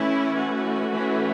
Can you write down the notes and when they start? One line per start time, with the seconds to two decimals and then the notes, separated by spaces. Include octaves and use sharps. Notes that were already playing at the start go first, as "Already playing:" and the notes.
Already playing: E3 A3 C#4 E4
0.37 F#4
0.90 E3 A3 C#4